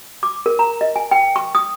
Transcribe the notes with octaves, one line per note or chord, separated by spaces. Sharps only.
D6
A#4
A#5
D#5
G#5
G5
C#6
D#6